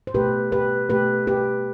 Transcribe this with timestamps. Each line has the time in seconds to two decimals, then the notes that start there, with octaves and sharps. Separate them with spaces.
0.07 C5
0.14 B2 A3 G4 B4
0.52 G4 B4
0.90 B2 A3 G4 B4
1.27 G4 B4